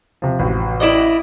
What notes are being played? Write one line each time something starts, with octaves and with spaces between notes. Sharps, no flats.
C3 F3
A1 F#4
E4 D5 D#5